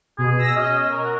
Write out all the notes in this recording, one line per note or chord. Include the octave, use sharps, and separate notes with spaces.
B2 G#4
E6 A#6
C#4 D#5
A#4
F#4